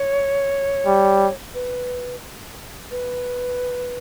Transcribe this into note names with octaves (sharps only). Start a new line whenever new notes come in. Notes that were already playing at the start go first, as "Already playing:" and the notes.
Already playing: C#5
G3
B4
B4